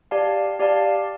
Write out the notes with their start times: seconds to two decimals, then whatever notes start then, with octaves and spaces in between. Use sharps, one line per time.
0.11 G4 D5 F5 A5
0.60 G4 D5 F5 A5